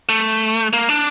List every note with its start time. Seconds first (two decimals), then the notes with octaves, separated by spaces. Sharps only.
0.09 A3
0.73 A#3
0.89 D4